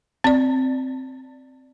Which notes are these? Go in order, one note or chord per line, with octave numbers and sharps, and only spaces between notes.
C4 D5